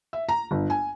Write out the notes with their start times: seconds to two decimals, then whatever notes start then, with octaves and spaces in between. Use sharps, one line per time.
0.13 E5
0.29 A#5
0.51 G1
0.70 G#5